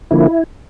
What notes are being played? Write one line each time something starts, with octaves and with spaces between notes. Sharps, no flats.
D3 F3 A#3 E4